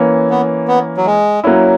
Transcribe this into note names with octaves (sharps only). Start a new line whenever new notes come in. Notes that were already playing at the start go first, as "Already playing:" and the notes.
Already playing: E3 A#3 C#4
B3
B3
F#3
G#3
F#3 A#3 C#4 E4